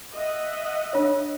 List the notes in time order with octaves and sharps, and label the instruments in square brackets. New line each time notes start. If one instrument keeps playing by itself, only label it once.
[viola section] D#5 E5 F#5
[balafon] D4 C#5